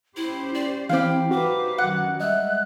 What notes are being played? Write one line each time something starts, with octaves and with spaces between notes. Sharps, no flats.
C#4 E4 G4 C5
D5
E3 C4 E4 G4 F5
D#4 F#4 B4 C5 D6
F#2 D#3 F#5
G3 G#3 D#5 E5 F#6